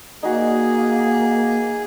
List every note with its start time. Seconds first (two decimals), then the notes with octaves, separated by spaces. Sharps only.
0.23 A#3 D#4 F#4 G#4